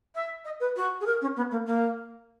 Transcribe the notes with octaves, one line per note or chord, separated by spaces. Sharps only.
E5
D#5
B4
F#4
G#4
A#4
C#4
B3
A#3
A#3